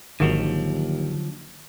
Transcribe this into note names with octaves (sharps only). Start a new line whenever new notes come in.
G#1 D#2 D3 D#3 F3 F#3 F#4